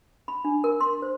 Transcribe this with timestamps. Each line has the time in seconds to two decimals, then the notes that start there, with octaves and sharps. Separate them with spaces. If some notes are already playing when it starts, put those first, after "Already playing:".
0.28 B5
0.45 D4
0.64 A#4
0.80 C6
1.02 C5